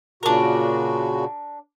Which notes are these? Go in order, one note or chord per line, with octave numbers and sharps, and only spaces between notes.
A#2 C#3 D4 F#4 A#4